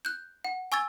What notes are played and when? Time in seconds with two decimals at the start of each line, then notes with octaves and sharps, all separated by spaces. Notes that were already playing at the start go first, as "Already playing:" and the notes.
0.05 F#6 G6
0.45 F#5
0.72 G#5 C#6 E6 G#6 A6